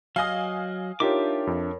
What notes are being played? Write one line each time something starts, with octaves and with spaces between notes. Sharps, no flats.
F#3 D#5 F5 G#5 D#6
D4 D#4 F4 G4 A#4 C#5 E5 D6
F2